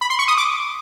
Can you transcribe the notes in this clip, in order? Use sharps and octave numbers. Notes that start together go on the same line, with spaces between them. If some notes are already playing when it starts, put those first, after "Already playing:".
B5
C6
C#6
D#6
D6